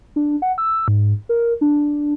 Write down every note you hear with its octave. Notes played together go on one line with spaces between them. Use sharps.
D4
F#5
E6
G#2
A#4
D4